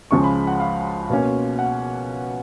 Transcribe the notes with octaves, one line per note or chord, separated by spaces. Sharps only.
C#2 C#3 F3 G#3 C#6
B5
F#5
F5
B2 A#3 C#4
F#5